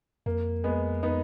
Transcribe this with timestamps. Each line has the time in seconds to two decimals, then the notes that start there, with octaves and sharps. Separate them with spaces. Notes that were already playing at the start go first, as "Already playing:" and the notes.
0.26 F2 A#3
0.64 G#3 B3
1.03 B3 D#4